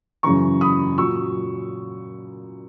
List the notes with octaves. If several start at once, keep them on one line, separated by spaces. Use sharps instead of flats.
F#2 C#3 E3 A#5 C#6
B5 D#6
A#2 F#3 C#6 E6